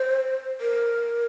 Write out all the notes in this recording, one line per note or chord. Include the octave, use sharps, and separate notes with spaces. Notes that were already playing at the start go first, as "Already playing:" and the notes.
Already playing: C5
A#4